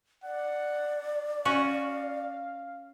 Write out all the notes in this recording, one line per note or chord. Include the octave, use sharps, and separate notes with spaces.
D5 F#5
C#4 F#4 F5